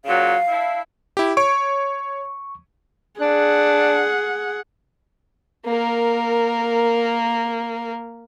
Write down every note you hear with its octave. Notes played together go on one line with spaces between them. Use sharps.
A#2 C#3 F#3 F5
D4 E4
E4 G4
C#5 C#6 D7
D4 G#4 F#5
A#3 A#4